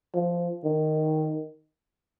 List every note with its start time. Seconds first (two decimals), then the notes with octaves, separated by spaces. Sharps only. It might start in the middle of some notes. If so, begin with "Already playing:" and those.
0.15 F3
0.64 D#3